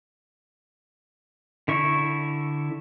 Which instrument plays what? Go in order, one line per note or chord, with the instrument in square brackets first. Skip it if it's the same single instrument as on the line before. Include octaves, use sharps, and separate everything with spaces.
[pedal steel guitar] D3 E4 C#6